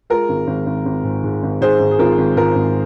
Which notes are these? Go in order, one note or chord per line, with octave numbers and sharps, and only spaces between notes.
G#3 F4 A#4
G#1
G#1
G#1
G#1
G#2
G#2
G#1
G#2 G#4 C5
G#1
G#4
G#1 F4 A#4
G#1
G#2 F4 A#4
G#1